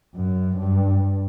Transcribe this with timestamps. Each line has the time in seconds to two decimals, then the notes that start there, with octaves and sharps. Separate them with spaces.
0.14 F#2
0.57 G2